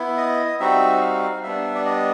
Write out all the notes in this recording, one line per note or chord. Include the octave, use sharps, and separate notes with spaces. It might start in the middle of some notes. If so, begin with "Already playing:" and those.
Already playing: B3 E4
D#5
G3 C4 D#4 F#4 E5
F5
G3 B3 D4 E5
D5
D#5